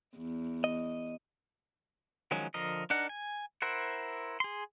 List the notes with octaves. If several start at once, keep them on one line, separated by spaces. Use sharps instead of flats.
E2
D#5
D#3 F3 F#3 G#3 C#4
D3 F3 A#4 D#5
D4 D#4 A#4 F#5
G#5
E4 A#4 C5 F#5
G#4 C6